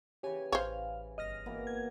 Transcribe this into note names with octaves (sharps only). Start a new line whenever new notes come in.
C#3 E3 G4 C#5 G#5
A1 C5 C#5 F5
G1 D#5 F6 A#6
B2 E3 A#3
G#6